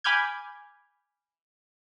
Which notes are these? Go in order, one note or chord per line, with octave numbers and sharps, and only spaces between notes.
G#5 B5 D6 F6 G6 G#6